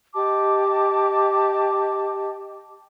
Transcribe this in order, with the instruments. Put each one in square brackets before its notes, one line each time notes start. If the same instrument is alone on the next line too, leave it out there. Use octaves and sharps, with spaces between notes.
[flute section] G4 D#5 A5 D6